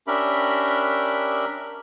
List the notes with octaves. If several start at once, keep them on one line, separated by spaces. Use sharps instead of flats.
C#4 D4 G4 A#4 E5 B5